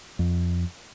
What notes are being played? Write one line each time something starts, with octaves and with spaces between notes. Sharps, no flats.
F2